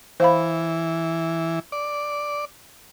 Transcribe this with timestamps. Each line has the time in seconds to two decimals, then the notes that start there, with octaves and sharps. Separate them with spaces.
0.20 E3 C5 F5 B5
1.72 D5